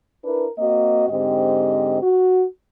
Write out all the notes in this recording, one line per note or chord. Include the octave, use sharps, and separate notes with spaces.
D4 E4 A#4 B4
A#3 C4 F#4 D#5
G#2 D3 C4 G4 D#5
F#4